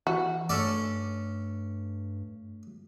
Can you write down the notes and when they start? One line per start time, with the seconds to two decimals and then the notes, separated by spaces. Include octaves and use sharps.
0.07 E3 F#4
0.49 G2 A3 C#4 A4 D5